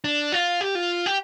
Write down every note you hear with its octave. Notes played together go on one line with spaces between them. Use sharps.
D4
F4
G4
F4
G4